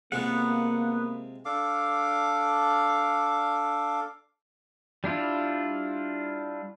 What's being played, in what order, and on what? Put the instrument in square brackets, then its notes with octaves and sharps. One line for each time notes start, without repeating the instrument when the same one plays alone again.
[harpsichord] C3 G#3 F4 [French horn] A#3 [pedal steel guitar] B3 F#5
[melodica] D4 A4 F5 D6
[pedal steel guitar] G3 D4 E4 F4